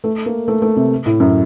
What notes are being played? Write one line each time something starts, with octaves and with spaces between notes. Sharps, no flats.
A3
A#3
A3
A3
C3
A2
F#2